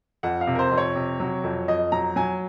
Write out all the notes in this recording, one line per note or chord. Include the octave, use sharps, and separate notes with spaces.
F2 F#5
F5
C3
A#4
C5
F2
C#5
C3
F#3
F2
F2 D#5
F#3 A#5
F#3 G#5